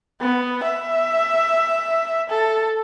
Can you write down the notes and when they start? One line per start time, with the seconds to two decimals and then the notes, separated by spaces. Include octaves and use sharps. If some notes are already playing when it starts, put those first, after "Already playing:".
0.20 B3
0.63 E5
2.29 A4